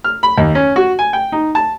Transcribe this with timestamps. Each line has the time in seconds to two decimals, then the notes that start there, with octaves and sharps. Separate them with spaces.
0.04 F6
0.23 B5
0.38 D#2
0.55 C#4
0.76 F#4
0.99 G#5
1.13 G5
1.32 D#4
1.55 A5